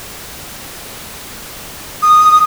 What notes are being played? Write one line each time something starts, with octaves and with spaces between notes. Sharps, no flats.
D#6